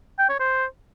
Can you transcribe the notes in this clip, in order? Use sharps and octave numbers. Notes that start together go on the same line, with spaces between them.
G5
C#5
C5